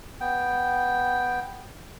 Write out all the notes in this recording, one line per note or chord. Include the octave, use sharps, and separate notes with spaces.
B3 G5